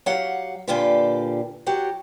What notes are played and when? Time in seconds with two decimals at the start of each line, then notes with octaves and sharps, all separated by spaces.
0.06 F#3 G4 F5 F#5
0.67 A#2 D3 F4 G4 A4 B4
1.66 F#3 F#4 G4